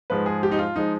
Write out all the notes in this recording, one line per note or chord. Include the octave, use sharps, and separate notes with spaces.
G#2 F3 G#3 B4
G#4
G4
D#4
F4
F3 G#3 D#4